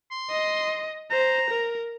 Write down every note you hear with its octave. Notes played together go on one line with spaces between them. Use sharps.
C6
D#5
C5 A#5
A#4